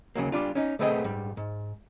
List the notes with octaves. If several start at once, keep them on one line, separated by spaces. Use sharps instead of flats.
D#2 C#3 F#3 A#3
G3 D4 F4
C#4 D#4
B1 A3 B3 C4 G#4 D#5
G#2 G3
G#2